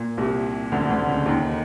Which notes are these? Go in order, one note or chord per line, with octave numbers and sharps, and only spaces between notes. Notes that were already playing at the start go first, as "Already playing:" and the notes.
Already playing: A#2
C2 C3
D2 D3
D2 D3
C#2 C#3
D#2 D#3